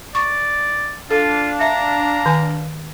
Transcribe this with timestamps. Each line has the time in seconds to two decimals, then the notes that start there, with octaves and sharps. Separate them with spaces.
0.15 D5 C#6
1.11 D4 F4 A4 F5
1.60 E5 A#5
2.26 D#3 G#5